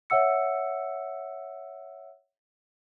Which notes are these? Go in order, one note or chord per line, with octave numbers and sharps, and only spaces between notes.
C#5 E5 F#5 E6 C#7